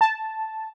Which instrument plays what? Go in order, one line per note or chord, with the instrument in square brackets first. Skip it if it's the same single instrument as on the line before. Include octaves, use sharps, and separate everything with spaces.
[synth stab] A5